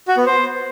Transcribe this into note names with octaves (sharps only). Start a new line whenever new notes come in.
F#4
B3
C5